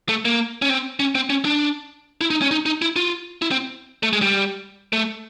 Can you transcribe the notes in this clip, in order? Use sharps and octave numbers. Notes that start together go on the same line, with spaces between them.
A3
A#3
C#4
C4
C#4
C4
C#4
D4
E4
D#4
C#4
D#4
D#4
E4
F4
E4
C4
A3
G#3
G3
A3